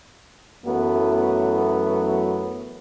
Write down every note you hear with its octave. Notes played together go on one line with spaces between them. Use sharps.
F#2 E3 F#3 A3 B3